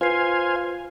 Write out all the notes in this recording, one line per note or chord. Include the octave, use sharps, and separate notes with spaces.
F4 B4 C5 F5 G#5 C7